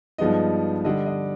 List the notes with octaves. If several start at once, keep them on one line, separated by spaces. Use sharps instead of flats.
G2 F3 G#3 B3 D#4 D#5
D3 G3 D4 D#5
D#5